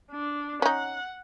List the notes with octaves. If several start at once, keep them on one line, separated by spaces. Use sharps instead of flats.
D4
C#4 D#4 F#5